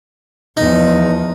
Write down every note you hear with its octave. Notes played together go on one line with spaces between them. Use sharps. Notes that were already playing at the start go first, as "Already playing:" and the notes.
E2 F3 D#4